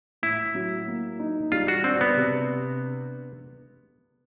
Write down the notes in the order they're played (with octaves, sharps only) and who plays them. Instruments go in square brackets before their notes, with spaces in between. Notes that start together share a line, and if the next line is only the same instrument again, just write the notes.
[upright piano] A2 [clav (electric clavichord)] E4
[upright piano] F#3
A#3
D#4
[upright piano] G3 [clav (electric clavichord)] F4
[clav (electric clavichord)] F#4
[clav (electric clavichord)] C4 [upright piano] D4
[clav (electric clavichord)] B3
[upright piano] C3